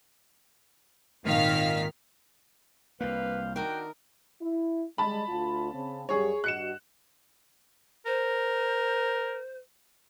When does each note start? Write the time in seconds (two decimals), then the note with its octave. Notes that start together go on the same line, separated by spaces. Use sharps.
1.26 G#1 A#2 D#3 F5 F6 B6
3.01 C2 G3 A#3 B4 C5 F5
3.56 D#3 A3 D4 F#4 A#4 G5
4.41 E4
4.98 G3 G#3 A5 B5
5.28 D2 F4
5.72 C#3 C4
6.09 F#2 G3 G4 G#4 C#5
6.44 G2 F#4 D#5 F#6 C#7 E7
8.06 A#4 C5